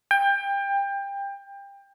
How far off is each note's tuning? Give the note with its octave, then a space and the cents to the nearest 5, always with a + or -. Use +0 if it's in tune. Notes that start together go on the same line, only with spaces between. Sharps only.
G5 +25